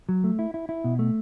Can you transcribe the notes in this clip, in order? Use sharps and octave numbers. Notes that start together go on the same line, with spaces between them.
F#3
A3
E4
E4
E4
B2
A3